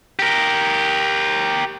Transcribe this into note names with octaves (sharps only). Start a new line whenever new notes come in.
G4 A#4